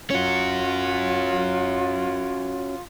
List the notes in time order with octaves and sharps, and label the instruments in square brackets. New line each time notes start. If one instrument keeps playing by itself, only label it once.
[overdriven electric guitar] C#4 F#4 [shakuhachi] F4